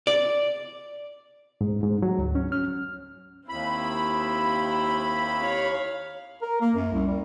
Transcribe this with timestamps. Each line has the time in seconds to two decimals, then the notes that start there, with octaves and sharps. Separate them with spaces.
0.07 D5
1.61 G#2
1.83 G#2
2.02 F#3
2.18 D2
2.35 C#4
2.52 F6
3.49 D#2 C4 E4 B5
5.42 C#5 F5
6.42 A#4
6.61 A#3
6.75 F#2
6.92 C2
7.07 G3